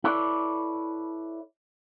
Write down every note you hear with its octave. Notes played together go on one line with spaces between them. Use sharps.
E4 A4 B4 C#5 D5